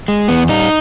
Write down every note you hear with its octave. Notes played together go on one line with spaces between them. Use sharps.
G#3
E2 B3
G3 D#4